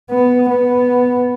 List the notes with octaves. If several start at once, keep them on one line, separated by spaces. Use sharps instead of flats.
B3
B3